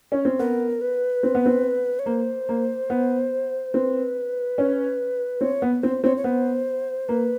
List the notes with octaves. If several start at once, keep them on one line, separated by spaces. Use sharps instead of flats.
C#4
C4
B3 A#4
B4
C4
B3
C4
C#5
A#3 C5
A#3
B3
C4 B4
C#4
C4 C#5
B3
C4 C5
C4 C#5
C#5
B3 C5
A#3 B4